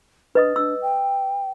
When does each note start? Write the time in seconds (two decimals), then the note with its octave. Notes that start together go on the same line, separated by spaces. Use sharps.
0.35 D4 B4 D#5 D#6
0.56 D4 E6
0.82 G5